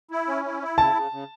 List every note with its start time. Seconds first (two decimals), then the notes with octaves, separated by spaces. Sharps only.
0.11 E4
0.27 C#4
0.45 E4
0.62 E4
0.78 C#3 A5
0.95 C#3
1.11 C#3